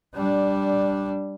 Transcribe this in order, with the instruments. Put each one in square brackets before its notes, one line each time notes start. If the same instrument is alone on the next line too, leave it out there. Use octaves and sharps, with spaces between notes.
[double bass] G3 D4